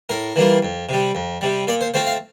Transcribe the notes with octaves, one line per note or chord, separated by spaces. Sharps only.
A2 A#4
E3 G3 A#3 F4
F2
C3 G3
F2
C3 G3
A#2 D5
C5
A3 C4 F4 C5
F5